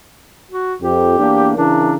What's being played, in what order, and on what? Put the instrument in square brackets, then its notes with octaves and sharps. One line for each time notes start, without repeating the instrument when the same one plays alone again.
[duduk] F#4
[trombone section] F2 [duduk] G4
[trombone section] E2 A#3 D4
[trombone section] C#3 E3 A#4 [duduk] D4